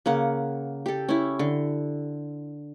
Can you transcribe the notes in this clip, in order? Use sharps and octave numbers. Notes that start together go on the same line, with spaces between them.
C#3 A#3 F#5
G4 A4
C#4 E4
D3